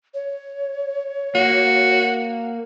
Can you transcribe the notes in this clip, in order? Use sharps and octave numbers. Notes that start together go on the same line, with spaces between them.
C#5
A#3 F#4